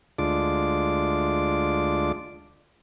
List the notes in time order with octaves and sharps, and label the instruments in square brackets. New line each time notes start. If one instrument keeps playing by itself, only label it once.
[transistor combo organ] D2 G#3 D4 F4 D6